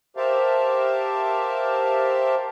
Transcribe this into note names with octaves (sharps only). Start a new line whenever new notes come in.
G4 A#4 C5 E5 F5 A5